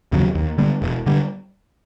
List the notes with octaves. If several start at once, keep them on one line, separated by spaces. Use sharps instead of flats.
D#2 C#3 F#3
D#2
D3 G3 B3
E1
D3 G3